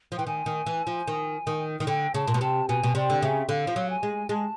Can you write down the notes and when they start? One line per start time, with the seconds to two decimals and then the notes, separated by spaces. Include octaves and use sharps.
0.12 F3
0.17 E3 G5
0.26 D#3 G#5
0.46 D#3
0.66 E3
0.87 F3
1.07 D#3
1.47 D#3
1.80 D#3
1.87 D3 G5
2.14 C#3 A5
2.28 A#2
2.34 B2
2.41 C3 A5
2.68 B2 G#5
2.84 B2
2.95 C3 D5
3.10 D3
3.22 C#3 E5
3.49 D3 F5
3.67 F3
3.76 F#3
3.90 G#5
4.03 G#3
4.29 G#3 A5